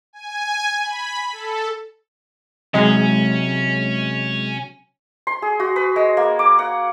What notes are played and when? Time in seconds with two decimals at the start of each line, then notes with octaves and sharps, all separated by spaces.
0.13 G#5
0.82 B5
1.32 A4
2.74 C3 F#3 G#3 C#4
5.27 C6
5.42 G#4
5.60 F#4
5.76 B4
5.96 G#3
6.17 A#3
6.39 D6
6.59 F#5